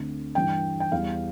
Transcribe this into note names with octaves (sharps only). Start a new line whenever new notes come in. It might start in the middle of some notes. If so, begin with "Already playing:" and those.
Already playing: D2 D3 A3 C4
G2 E3 G3 G5
G5
E2 E3 G3 F5